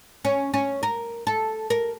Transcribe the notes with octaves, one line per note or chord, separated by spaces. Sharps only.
C#4
C#4
A#4
A4
A#4